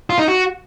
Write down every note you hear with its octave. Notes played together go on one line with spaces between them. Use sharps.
F4
D#4
F#4